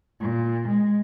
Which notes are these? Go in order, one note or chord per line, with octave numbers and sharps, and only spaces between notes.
A#2
G#3